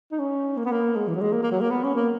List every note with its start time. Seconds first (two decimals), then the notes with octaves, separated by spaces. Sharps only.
0.12 D#4
0.19 C#4
0.57 A#3
0.65 B3
0.72 A#3
0.96 G#3
1.08 E3
1.16 F#3
1.21 G#3
1.32 A#3
1.43 A#3
1.51 F#3
1.61 A#3
1.71 B3
1.84 C#4
1.95 A#3